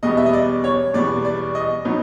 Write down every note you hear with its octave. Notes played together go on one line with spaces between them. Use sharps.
E2 B2 G3 B3 D#5
E5
D#5
D5
C#5
E2 B2 G3 B3 D5
D5
D#5
B2 F#3 B3 D#4